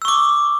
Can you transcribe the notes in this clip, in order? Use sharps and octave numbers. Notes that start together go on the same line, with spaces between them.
C#6 D6 E6